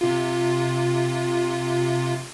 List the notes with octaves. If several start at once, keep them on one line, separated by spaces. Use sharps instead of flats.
C3 F4